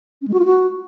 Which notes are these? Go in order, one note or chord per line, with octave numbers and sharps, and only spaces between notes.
C#4
G#3
F#4
F4
F#4